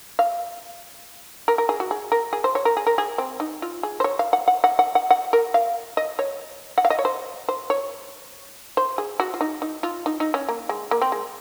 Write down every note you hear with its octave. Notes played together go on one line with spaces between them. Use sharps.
F5
A#4
A#4
G#4
F#4
G#4
A#4
G#4
C5
C#5
A#4
G#4
A#4
G#4
C4
D#4
F4
G#4
C5
C#5
F5
F#5
F#5
F#5
F#5
F#5
F#5
A#4
F5
D#5
C#5
F#5
F5
D#5
C#5
C5
C5
C#5
C5
G#4
F#4
F4
D#4
D#4
F4
D#4
D#4
C#4
A#3
G#3
A#3
C4
G#3